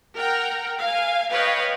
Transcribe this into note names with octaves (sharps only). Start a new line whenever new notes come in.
A#4 F#5 G5 A#5
F5 G#5
B4 C#5 D#5 F5 G5